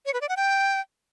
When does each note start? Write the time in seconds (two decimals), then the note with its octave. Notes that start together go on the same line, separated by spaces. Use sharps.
0.06 C#5
0.14 B4
0.21 D5
0.29 F#5
0.37 G5